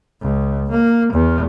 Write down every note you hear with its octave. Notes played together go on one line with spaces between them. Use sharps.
C#2
A#3
E2